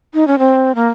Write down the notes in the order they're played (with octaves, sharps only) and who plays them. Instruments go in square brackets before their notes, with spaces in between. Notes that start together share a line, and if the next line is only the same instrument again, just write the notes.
[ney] D#4
C#4
C4
A#3